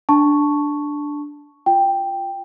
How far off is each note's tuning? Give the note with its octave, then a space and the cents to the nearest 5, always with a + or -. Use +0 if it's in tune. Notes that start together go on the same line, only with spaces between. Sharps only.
D4 +0 A5 +0 C#6 +0
F4 +0 G5 +0